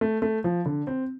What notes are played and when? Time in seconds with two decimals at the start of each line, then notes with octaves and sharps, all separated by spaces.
0.01 A3
0.22 A3
0.44 F3
0.66 D3
0.87 C4